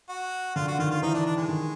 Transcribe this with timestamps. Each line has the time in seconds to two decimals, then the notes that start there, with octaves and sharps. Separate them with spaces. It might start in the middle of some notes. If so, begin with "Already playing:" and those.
0.09 F#4
0.56 D3 F4
0.68 F#4
0.79 D#3 F4
0.91 F4
1.02 E3 D#4
1.14 D4
1.26 D4
1.37 G#3
1.49 D#3